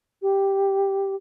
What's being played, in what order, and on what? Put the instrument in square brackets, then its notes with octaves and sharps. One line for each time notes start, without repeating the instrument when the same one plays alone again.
[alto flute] G4